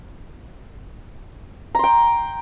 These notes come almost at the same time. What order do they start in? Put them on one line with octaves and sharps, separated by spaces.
A#5 C6 G5